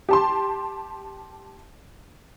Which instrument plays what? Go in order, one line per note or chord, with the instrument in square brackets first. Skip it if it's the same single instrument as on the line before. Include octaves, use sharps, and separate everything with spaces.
[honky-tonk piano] G4 A5 C6